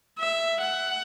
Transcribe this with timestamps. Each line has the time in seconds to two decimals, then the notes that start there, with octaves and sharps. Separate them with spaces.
0.18 E5
0.61 F#5